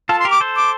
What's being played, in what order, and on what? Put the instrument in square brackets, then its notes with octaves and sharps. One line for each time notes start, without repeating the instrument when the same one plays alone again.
[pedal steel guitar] F4 A4 [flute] A5
[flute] C6
[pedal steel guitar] G4 A#4 [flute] D6
[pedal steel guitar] A4 C5
[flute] D6